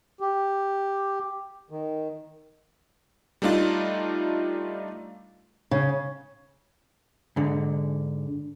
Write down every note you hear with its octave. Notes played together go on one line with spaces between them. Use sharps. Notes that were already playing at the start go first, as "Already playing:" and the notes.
G4
D#3
G3 A3 D4 D#4 F4
C#3
G#2 D3